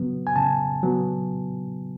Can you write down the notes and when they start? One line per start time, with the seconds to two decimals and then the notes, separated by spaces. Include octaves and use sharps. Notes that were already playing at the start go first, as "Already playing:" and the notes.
Already playing: C#3 F#3 B3
0.27 G#5
0.36 C#3 A5
0.83 F#3 B3